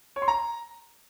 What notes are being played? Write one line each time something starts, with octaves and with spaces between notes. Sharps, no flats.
C#5
C6
A#5